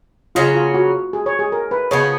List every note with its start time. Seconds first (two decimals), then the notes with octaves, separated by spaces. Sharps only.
0.35 C#3 F#3 C#4 F4
0.55 F4
0.74 F#4
1.13 G#4
1.26 C#5
1.39 G#4
1.52 A#4
1.71 B4
1.91 C#3 F3 B3 C#5